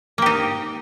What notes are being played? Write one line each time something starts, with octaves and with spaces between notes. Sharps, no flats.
A#3 D#4 G4